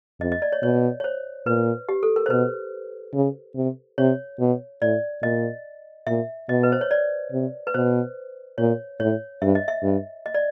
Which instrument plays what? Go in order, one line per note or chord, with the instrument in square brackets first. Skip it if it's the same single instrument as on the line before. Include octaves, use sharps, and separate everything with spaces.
[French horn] F2 [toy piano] D#5
[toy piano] D#5
D5
C#5
[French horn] B2 [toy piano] C#5
[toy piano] C#5
C5
[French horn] A#2 [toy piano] B4
[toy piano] G4
A4
A#4
C5
[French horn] B2 [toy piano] B4
[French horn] C#3
C3
[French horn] C3 [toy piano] C#5
[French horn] B2
[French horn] A2 [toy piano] D5
[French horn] A#2 [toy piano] D#5
[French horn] A#2 [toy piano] E5
[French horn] B2 [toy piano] D#5
[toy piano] B4
C5
C#5
D5
[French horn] C3
[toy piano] B4
[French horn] B2 [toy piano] C5
[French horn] A#2 [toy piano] C#5
[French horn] A2 [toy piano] C#5
[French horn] G2 [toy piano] E5
[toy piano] D#5
E5
[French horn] G2
[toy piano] D#5
D5